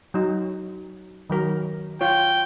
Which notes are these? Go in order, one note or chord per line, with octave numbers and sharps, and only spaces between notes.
F#3 D#4
D#3 F#3 A#4
F4 C#5 G5